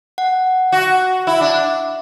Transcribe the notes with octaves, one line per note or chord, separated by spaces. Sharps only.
F#5
F#4
E4
D4